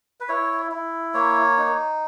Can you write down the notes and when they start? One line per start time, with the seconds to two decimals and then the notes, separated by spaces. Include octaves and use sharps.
0.20 B4
0.29 E4 C#5
0.71 E4
1.14 A#3 C#5
1.58 D#4